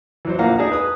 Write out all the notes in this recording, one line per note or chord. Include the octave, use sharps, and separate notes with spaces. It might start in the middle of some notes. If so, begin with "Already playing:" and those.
E3 F#3 C5
A#1 F3 A#3 F5 F#5 A#5
D#4 G#4 D5 A5 A#5
B4 D#6